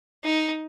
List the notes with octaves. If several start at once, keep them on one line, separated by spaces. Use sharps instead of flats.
D#4